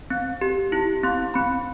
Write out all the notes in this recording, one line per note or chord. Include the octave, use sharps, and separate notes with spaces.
C4
G4
E4
C4 C6
C4 B5